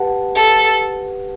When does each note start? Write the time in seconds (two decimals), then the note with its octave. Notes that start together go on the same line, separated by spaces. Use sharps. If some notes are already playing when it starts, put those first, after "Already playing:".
Already playing: G4 B4 F#5 A5
0.36 A4